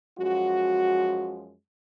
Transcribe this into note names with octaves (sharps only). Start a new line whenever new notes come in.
F#2 F3 G#3 F#4